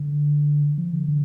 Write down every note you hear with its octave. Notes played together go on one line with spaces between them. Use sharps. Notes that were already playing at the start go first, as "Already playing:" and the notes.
Already playing: D3
F3
D3
D3